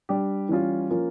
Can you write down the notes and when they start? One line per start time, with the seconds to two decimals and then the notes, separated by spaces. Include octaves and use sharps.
0.09 G3 D4 G4
0.49 E3 G3 C#4 F4
0.90 F3 A#3 C#4 F4